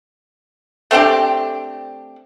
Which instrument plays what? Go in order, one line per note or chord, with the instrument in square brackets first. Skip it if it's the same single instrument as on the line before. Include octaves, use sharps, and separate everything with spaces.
[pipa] A3 C4 D4 G4